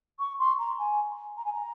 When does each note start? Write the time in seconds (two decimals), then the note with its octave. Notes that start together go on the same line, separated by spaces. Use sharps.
0.19 C#6
0.39 C6
0.58 A#5
0.78 G#5
1.37 A#5
1.45 G#5
1.52 A#5